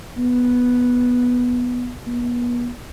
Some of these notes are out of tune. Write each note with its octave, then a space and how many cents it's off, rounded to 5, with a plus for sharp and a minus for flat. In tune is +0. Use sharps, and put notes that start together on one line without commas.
B3 -5
B3 -35